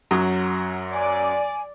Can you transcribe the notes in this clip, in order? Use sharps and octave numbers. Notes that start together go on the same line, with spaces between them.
F#2 F#3 F#4 D#6
D5 G#5